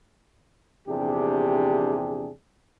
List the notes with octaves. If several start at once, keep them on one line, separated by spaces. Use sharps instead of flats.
A#1 E2 C3 D4 G4 G#4